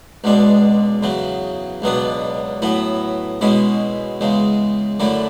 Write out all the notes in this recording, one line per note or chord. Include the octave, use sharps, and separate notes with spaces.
C#2 B2 G#3 D4
E2 C#3 F#3
C#2 B2 F#3 B3 D4
A2 F#3 B3 E4
B2 G#3 C#4 E4
E2 C#3 G#3
F#2 D3 F#3 A3 E4